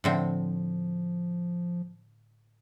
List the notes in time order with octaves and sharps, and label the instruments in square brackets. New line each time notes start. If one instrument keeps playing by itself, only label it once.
[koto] A2 D3 C4 [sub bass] F3